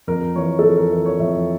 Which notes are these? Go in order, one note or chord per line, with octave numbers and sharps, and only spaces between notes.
F2 A#4
E3 C#5
A4
F2 A#4
A#4
E3 A#4
C#5
F2 E5